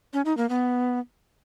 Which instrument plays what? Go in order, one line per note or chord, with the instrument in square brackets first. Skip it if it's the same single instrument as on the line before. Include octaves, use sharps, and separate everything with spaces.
[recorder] C#4
D#4
A#3
B3